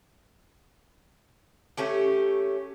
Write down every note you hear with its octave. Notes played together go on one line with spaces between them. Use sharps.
A3 C#4 G4